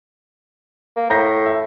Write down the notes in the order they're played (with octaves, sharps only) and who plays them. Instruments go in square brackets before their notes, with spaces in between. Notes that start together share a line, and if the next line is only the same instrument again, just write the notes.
[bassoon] A#3
[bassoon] A2 [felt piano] A#5 G6 A#6
[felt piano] E5